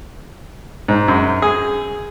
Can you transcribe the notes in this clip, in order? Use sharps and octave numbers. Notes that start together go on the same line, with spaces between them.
G#2
F#2
G#4